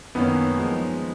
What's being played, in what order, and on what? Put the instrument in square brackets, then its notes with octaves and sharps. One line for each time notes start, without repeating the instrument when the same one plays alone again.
[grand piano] F#2 D#3 A#3 C#4 [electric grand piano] B3 D#4
[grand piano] F3 G#3